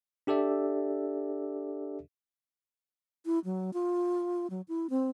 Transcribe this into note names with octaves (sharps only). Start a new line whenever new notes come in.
D4 G4 A4 D5 E5
E4
F#3
F4
F#3
E4
C4